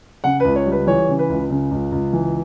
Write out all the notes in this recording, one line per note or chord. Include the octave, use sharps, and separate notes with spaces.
C#3 F#5
C#2 B4
C#5
G3
B4
E3 C#5
C#3
B4
C#2
C#3
C#2
C#2
E3